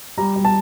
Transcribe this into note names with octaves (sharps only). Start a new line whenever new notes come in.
G3 A#5
G3
A5